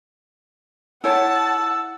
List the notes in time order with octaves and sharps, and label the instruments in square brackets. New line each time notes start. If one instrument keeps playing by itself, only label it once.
[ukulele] E4 C#5 [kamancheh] F#5 [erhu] A5 [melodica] E6